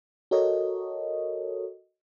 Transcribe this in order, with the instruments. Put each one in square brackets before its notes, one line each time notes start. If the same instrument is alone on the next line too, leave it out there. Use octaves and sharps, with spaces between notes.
[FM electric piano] F#4 A4 A#4 C#5 D#5